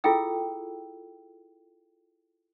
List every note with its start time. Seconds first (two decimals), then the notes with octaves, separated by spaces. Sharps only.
0.04 E4 F4 G#4 A4 G5 E6